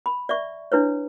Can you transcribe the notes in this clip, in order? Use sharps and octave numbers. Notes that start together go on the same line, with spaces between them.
B5
D5 E5 C#6
D4 E4 B4 C#5